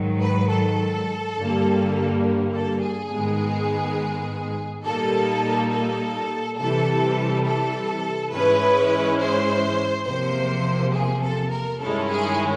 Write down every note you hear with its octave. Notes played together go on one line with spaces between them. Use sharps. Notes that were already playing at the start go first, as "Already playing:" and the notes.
Already playing: G#2 D#3 F#3
B4
A4
G2 D3 G3 A#3
A4
G#4
G#2 D#3 G#3 B3
A#2 G3 A#3 D#4 A4
A4
C3 E3 G3 A4
A4
G#2 E3 G#3 C#4 E4 B4
C5
E2 C3 F3 A#3 C5
G#4
A4
A#4
G2 D#3 G#3 C#4 E4 A4
G#4